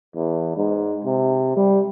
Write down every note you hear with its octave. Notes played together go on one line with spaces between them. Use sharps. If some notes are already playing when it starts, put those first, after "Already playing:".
E2
G#2
C3
G3